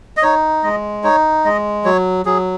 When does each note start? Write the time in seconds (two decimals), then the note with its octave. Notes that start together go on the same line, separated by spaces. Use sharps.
0.17 D#5
0.23 D#4 C#5
0.63 G#3 D#5
1.04 D#4 C#5
1.45 G#3 D#5
1.85 F#3 C#5
2.26 F#3 G#4